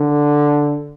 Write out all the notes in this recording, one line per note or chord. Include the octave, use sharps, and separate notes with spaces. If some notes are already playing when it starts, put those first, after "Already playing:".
Already playing: D3